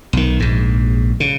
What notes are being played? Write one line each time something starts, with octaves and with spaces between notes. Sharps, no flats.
B1 D#3
A#1 G#2
C#3